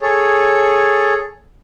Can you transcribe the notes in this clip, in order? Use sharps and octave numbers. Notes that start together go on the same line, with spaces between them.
G#4 A4 C#5